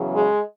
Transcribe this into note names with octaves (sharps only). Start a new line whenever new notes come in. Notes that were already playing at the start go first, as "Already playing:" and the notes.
Already playing: E2 C#3 F#3
G#3